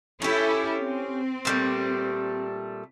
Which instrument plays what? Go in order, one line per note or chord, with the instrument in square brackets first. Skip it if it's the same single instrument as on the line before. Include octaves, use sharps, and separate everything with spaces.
[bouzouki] C#4 G4 [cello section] E4 A4
[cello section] C4
[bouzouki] A#2 G3 A3